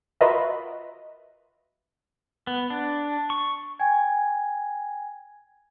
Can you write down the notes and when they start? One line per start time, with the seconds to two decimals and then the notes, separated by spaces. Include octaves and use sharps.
0.21 F4 F#4 A#4 B4 D#5 E5
2.47 B3
2.70 D4
3.30 C#6
3.79 G5 G#5 G#6